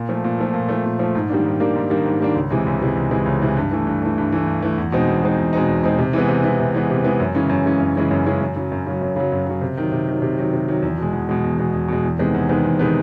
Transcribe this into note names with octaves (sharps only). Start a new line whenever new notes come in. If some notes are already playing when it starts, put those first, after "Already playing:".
Already playing: A#2
F3 A3
A#2
F3 A3
A#2
F3 A3
A#2
F3 A3
G#2
D#3 G3 A#3 D4
G#2
D#3 G3 A#3 D4
G#2
D#3 G3 A#3 D4
G#2
D#3 G3 A#3 D4
C#2
C3 E3 G#3
C#2
C3 E3 G#3
C#2
C3 E3 G#3
C#2
C3 E3 G#3
G2
E3 A3
G2
E3 A3
G2
E3 A3
G2
E3 A3
E2
B2 G#3 C4 D#4
E2
B2 G#3 C4 D#4
E2
B2 G#3 C4 D#4
E2
B2 G#3 C4 D#4
C3
E3 G#3 B3
C3
E3 G#3 B3
C3
E3 G#3 B3
C3
E3 G#3 B3
F#2
C#3 E3 G#3 C#4
F#2
C#3 E3 G#3 C#4
F#2
C#3 E3 G#3 C#4
F#2
C#3 E3 G#3 C#4
F#2
C#3 F#3
F#2
C#3 F#3
F#2
C#3 F#3
F#2
C#3 F#3
C3
D#3 F#3
C3
D#3 F#3
C3
D#3 F#3
C3
D#3 F#3
E2
B2 G#3
E2
B2 G#3
E2
B2 G#3
E2
B2 G#3
E2
C3 D#3 G#3 B3
E2
C3 D#3 G#3 B3
E2
C3 D#3 G#3 B3